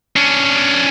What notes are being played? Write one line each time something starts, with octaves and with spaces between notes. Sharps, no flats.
C#4 D4